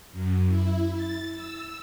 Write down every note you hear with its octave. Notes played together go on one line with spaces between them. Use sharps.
F#2
E4
A6
E6